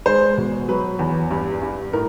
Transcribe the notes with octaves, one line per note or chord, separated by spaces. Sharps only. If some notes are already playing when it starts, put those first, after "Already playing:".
G#3 C5
B2
F#3 B4
E2
G2
G2
A2 A#4